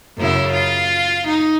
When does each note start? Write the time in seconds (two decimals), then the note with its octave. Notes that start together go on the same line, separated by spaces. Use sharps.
0.18 F#2 C#3 E4
0.53 F4
1.27 D#4